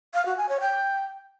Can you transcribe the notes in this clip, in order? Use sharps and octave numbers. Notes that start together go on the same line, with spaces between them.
F5
F#4
G#5
C#5
G5